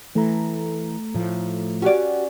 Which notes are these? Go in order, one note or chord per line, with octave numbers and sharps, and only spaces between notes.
E3 A3 A4 A#5
A2 F3
C#4 F#4 G4 D5 F#5